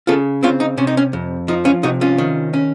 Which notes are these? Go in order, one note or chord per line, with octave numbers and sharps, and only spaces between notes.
C#3 F4 A4
C4 C#4 F4
D#4
C3 C#4
D#4
C#4
F2
F3 D#4
C#4 F4
C3 D#4 F#4
C#4 F4
D#3
C#4